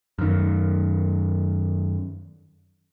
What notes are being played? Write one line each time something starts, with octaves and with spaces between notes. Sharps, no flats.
F#2 D#3